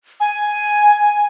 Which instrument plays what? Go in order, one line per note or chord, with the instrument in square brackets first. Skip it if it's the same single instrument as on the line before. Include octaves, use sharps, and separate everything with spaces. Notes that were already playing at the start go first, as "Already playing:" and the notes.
[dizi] G#5